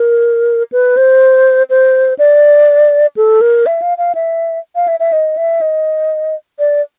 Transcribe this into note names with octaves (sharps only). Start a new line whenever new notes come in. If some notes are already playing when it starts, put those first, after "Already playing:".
Already playing: A#4
B4
C5
C5
D5
A4
A#4
E5
F5
F5
E5
F5
E5
E5
D#5
E5
D#5
D5